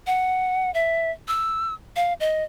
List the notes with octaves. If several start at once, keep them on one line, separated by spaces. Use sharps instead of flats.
F#5
E5
E6
F5
D#5